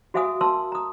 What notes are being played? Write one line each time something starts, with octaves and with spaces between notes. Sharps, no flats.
F#4 G#4 E5 F5 G#5 D#6
A#4 A5 C6 E6
A#5 D#6